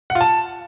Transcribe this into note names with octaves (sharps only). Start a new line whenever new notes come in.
F#5
F4
A5